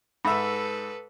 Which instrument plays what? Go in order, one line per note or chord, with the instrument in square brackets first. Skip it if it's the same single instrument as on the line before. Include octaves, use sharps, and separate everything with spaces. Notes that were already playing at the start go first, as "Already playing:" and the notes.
[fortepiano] G#2 E5 [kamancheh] A4 B4 [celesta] B5